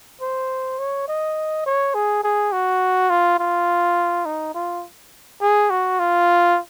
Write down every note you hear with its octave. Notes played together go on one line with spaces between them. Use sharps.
C5
C#5
D#5
C#5
G#4
G#4
F#4
F4
F4
D#4
F4
G#4
F#4
F4